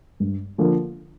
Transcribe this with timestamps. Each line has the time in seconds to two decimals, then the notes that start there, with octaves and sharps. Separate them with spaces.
0.20 G2
0.58 D3 F3 A#3